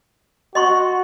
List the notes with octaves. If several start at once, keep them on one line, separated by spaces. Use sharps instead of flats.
F#4 D#5 C6 C#6